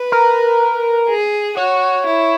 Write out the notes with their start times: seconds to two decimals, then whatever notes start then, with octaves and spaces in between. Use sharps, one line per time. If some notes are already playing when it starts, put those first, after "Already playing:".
Already playing: B4
0.12 A#4
1.09 G#4
1.57 F#4 C#5
2.06 E4